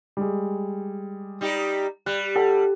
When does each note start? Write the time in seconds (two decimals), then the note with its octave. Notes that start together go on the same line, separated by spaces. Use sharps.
0.17 G3 G#3
1.41 G3 D#4 G4
2.06 G3 F#6
2.35 G4 A4 F#5